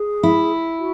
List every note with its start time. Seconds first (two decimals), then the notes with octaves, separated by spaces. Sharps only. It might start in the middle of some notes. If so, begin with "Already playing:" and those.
Already playing: G#4
0.23 E4
0.79 F#4